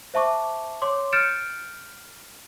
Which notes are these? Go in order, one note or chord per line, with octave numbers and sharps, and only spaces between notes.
C5 E5 A5 C#6 D6
C#5 C6 D6
F6 G6 A6 C#7 D7 E7